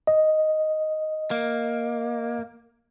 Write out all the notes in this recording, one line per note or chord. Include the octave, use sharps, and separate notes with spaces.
D#5
A#3